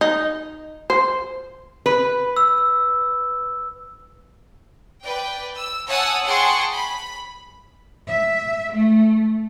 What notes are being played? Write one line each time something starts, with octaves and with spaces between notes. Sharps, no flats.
D#4
C5
B4
E6
B4 D5 G5
E6
C#5 F#5 G#5 A5 D#6 E6
G#4 F#5 G5 A5 C6 C#6
B5
E5
A3